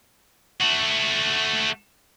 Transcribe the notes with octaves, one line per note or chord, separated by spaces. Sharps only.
A3 F#4